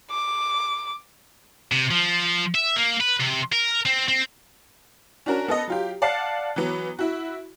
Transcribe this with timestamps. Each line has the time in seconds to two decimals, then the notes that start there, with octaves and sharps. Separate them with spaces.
0.11 D6
1.72 C3
1.91 F3
2.54 E5
2.76 A#3
3.01 B4
3.20 C3
3.52 A#4
3.85 C4
4.08 C4
5.26 C#4 D4 F#4 A#4
5.48 B3 A4 D#5
5.68 F#3 F4 G4
6.02 D5 F5 F#5 A5 C7
6.56 E3 F#3 B3
6.99 E4 F#4